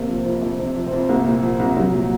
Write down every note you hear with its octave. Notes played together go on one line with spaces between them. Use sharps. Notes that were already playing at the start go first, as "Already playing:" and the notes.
Already playing: C3 A#3
F3
F2
F2 C3 C4
C3
F3
C4 C5
F2
C2 A#3 A#4
A#2
F3
C2
C2 F#3 F#4
A#2